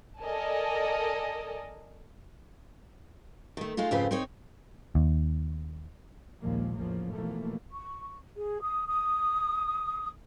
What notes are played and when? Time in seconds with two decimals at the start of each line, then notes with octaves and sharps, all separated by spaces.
0.21 A4 A#4 D5 D#5 G#5 A5
3.57 D#3 A3
3.77 G#3 A3 D#4 F4
3.91 F2 G#2 C#3 C4 F4 B4
4.11 C4 D#4 C#5
4.95 D#2
6.42 A#1 D#2 A#2 F3 G#3 A#3
6.77 E2 A2 C#3 F3 A#3
7.12 B2 E3 F3 A3 A#3
7.72 C#6
8.36 G#4
8.62 D#6
8.87 D#6